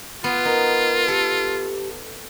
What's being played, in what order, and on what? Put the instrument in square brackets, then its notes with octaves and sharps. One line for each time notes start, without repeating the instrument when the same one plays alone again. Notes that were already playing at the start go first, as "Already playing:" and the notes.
[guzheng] B3 [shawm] F4
[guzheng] D#4 [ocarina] A#4
[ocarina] G4 [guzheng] A4